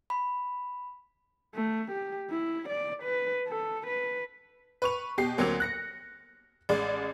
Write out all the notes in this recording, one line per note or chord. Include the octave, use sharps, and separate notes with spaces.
B5
A3
G4
E4
D5
B4
A4
B4
B4 C#6 F7
B2 G4 C7
D2 F#3 A#3 C4 F7
F#6 A#6 C#7
A1 G#3 D5